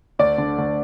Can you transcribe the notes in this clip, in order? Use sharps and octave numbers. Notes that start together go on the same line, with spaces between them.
D2 D5
D3
D2